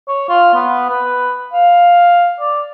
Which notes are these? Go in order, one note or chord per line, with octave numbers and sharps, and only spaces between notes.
C#5
F4
B3
B4
F5
D5